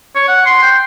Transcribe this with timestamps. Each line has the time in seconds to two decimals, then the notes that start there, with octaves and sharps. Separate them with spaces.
0.15 C#5
0.28 F#5
0.46 C6
0.63 G5